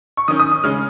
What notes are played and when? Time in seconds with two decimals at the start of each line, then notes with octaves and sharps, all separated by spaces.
0.17 C#6
0.28 D#3 C#4 D#6
0.40 D#6
0.52 D#6
0.63 C#3 G#3 C#4 F6